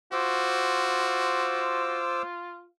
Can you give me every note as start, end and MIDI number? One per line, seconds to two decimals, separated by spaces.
0.13 2.66 65
0.13 2.01 66
0.13 2.22 72
0.13 2.22 86
0.13 2.22 88